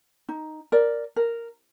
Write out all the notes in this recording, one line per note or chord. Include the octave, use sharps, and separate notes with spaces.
D#4
A#4 D5
A#4